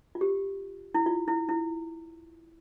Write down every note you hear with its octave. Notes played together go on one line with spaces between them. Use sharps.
F4
G4
E4
F4
E4
E4